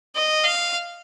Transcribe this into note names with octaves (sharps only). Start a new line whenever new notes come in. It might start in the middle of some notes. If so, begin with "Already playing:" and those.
D#5
F5